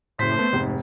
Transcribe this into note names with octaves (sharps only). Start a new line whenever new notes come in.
F#1 A2 C5 B6
A3 B3
F1 G#2